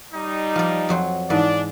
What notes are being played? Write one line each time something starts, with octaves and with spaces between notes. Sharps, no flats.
G3 D#4
F3 D5
F2 F#3 C5
G#2 E3 D4 D5